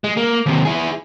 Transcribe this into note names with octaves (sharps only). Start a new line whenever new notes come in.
G#3
A#3
D#2 C3
E4 G#4